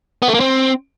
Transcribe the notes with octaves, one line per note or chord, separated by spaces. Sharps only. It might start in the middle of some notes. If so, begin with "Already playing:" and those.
B3
A3
A#3
C4